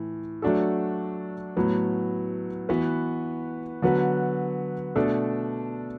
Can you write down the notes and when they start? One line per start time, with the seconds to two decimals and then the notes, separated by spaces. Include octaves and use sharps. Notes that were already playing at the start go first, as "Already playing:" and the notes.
Already playing: A2 E3
0.42 F#3 A3 D4 F#4 A4
1.57 A2 F#3 B3
2.69 E3 B3 F#4 B4
3.82 D3 F#3 B3 F#4 B4
4.96 B2 A3 D4 A4